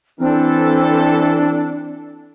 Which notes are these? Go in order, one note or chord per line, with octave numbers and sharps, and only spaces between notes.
E3 C4 D4 A4